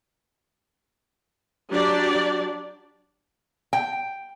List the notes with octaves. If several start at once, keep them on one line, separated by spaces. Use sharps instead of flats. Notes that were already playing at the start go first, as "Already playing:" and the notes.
F#3 D4 G4 D5
G5